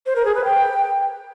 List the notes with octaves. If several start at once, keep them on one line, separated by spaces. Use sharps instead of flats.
C5
A#4
G#4
B4
G5